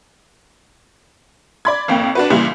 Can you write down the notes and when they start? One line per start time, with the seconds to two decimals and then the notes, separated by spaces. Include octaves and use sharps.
1.65 D5 B5 G#6
1.88 G#1 F2 A#3 G5
2.15 D4 F#4 B4
2.30 C#2 A#2 E3 G3